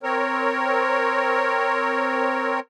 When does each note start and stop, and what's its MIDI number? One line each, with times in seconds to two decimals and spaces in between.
0.03 2.60 60
0.03 2.60 70
0.03 2.60 73